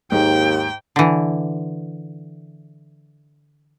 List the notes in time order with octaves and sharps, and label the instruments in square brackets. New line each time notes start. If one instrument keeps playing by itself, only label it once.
[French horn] D#2 [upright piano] G#2 [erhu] G5
[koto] D3 E3